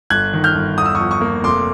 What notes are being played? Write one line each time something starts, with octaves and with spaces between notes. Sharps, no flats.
G1 F#6 G#6
D#3
F6 G6
G1
E2 D#6
E6
C#6 D#6
F3
C#6 D#6
A#3
F1 C6 D6